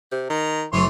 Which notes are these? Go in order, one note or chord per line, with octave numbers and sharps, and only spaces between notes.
C3
D#3 A#5
F#1 E3 F#3 A3 C#5 C6